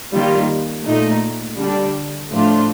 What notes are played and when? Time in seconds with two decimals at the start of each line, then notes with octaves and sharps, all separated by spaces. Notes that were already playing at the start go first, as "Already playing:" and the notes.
0.13 D#3 G3 A#3 F4
0.86 A#2 A3 D#4
1.60 D3 G3 D4
2.33 A2 F3 A3 D4 F4